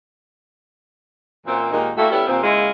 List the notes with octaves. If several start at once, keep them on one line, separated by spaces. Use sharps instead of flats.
F#2 A#2 E3 C4
D#2 A#2 G#3 A#3 D#4
G3 A3 A#3 E4 F#4 A4
G3 B3 C#4 E4 G4 A4
D#2 A#2 F3 C4
C#3 G#3 A#3 E4 F4